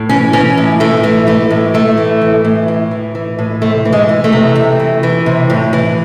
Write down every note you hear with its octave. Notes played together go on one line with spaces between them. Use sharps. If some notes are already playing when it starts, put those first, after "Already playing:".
Already playing: A2
E3 C#4
E3 C#4
A2
A2 A3
E3
E3 A3
A2
A2 A3
E3
E3
A2
A2
E3
E3
A2
C3 A3
E3
G#3
E3
A3
C3
C3
E3
E3
C3
A2
E3